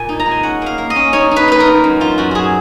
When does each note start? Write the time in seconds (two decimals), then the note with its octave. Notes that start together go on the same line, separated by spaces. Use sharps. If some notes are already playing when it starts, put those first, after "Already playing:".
Already playing: A#2 G#5
0.09 D#4
0.20 A#5
0.26 G#3
0.31 G#5
0.43 C#4 F#5
0.62 A#3 F5
0.78 A#3
0.90 D#5
0.96 C#4
1.13 D#4 C#5
1.31 D#4 B4
1.48 D#4 B4
1.60 A#4
1.66 D#4
1.84 F#2
2.00 F#2 F4
2.18 F#2 F#4
2.31 F#3 F#4 G#4